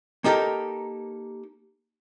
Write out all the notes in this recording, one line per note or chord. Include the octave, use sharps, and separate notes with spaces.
A#3 D#4 G4 A4 A#4